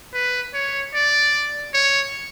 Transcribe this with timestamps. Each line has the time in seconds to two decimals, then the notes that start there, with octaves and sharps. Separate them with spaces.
0.14 B4
0.54 C#5
0.94 D5
1.74 C#5